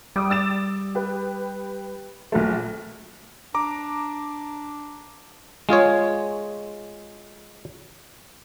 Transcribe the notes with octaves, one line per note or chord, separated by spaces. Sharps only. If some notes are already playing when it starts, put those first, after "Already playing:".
G3 D6 D#6
E6 A6 E7
G4 B4
A#1 F#3 A3
D4 A#5 D6
G#3 F4 G#4 C#5